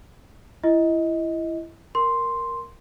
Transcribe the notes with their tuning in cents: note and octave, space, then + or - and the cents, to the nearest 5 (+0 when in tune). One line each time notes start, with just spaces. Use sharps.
E4 +20 D#5 +20
A#4 +0 C6 +0